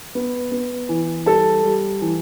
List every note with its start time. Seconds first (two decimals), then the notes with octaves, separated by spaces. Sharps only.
0.15 B3
0.52 B3
0.89 E3
1.26 G3 A4 A5
1.64 G3
2.02 E3